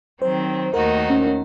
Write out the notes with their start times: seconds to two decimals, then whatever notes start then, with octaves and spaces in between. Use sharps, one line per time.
0.21 D#3 F#3 C4 C5
0.74 D#2 D#3 A3 D#4 F#4 A#4
1.10 C#4
1.27 C#4